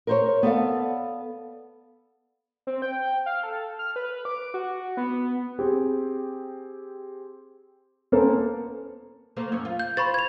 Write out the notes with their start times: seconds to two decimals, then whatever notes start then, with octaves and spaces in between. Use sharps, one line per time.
0.07 A#4 C5 C#5
0.43 B3 A4 D5 F5
2.67 C4
2.82 G5
3.26 F5
3.43 A4
3.79 F6
3.96 B4
4.25 D6
4.54 F#4
4.97 B3
5.59 C4 G4 G#4
8.12 A#3 B3 C#4 A4 A#4 C5
9.37 A3 A#3 C5
9.52 F#2 C#4
9.65 F4
9.79 G6
9.97 C5 B5 C#6 A6
10.14 G#6 F7